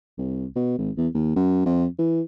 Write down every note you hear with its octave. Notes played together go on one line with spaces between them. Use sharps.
C2
B2
G#1
E2
D#2
F#2
F2
E3